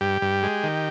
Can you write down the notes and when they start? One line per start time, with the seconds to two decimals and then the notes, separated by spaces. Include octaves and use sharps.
0.01 G2 G4
0.22 G2
0.43 G#3
0.64 D#3